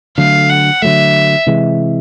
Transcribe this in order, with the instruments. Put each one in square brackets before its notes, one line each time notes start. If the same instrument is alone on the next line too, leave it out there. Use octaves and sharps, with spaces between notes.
[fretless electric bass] D3 F#3 A3 [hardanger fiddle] F5
[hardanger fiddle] F#5
[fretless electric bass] D3 F#3 A3 [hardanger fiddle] E5
[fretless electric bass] C3 E3 G#3